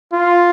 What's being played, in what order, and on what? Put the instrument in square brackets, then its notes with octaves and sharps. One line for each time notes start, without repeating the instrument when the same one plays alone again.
[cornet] F4